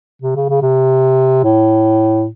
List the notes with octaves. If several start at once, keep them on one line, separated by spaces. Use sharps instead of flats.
C3
C#3
C#3
C3
A2